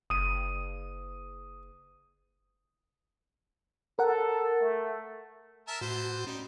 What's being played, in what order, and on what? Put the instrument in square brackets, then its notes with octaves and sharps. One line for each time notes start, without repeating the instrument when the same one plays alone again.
[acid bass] F#1 [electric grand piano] D#6 D#7
[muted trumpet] A4 [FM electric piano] A#4 F#5
[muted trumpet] A3
[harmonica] A#4 E5 A5
[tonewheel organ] A2 F#4 [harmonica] E3 C5
[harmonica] G3 D#4 [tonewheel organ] C#4